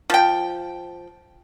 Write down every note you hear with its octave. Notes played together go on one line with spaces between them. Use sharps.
F3 G5